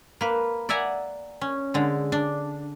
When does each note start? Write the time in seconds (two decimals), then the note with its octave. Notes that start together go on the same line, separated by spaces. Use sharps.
0.21 A#3 B4
0.69 D5 E5 F#5 G#5 A#5
1.41 C#4
1.74 D3 G#3
2.12 D4